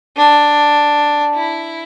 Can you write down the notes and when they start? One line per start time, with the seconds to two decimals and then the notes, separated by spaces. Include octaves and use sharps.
0.17 D4
1.34 E4